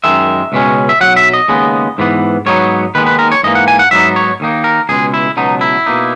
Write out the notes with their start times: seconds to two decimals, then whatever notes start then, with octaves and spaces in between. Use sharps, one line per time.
0.04 F#2 D#3 G#3 E5
0.52 C#2 B2 G#3 C#4
0.89 E5
1.01 B1 B2 F#3 F#5
1.16 E5
1.33 D#5
1.48 D#2 C#3 G#3 B3
1.98 G#2 E3 B3
2.46 G#2 F#3 B3 D#4 C#5
2.95 D#2 D#3 G#3 B3 B4
3.07 B4
3.19 A#4
3.32 C#5
3.43 G#2 E3 A#3 D#5
3.55 F#5
3.68 G#5
3.79 F#5
3.91 G#2 F#3 B3 D#4 E5
4.16 C#5
4.40 D#2 D#3 A#3 D#4
4.64 A#4
4.89 C#2 B2 G#3 G#4
5.14 E4
5.37 C#2 B2 F#3 B3 D#4
5.61 E4
5.86 B2 A#3 D#4